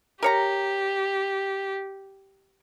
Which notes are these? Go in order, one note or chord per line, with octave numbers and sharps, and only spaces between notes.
G4 A#4 C#5 A#5